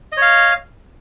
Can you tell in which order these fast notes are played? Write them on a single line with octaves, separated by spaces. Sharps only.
D#5 C#5 F5